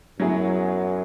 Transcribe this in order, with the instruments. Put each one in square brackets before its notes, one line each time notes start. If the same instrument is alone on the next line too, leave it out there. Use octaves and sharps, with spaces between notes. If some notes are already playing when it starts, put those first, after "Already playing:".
[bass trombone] F#2 [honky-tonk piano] F#3 B3 E4 G#4